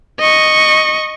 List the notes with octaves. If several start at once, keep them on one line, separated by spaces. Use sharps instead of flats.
D#5 C#6